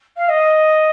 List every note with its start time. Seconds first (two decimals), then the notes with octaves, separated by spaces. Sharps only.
0.17 F5
0.28 D#5